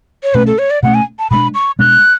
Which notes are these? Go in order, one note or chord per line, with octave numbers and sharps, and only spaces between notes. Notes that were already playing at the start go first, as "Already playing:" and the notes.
C#5
B2 A3 C#4 B4
A4
C#5
D5
B2 A3 C#4 F#5
G#5
A5
B2 G#3 B3 D4 B5
C#6
B2 G#3 B3 D4 F#6